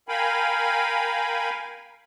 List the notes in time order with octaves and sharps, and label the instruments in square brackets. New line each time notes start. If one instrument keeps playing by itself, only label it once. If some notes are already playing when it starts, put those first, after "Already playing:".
[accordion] A#4 F5 G5 G#5 B5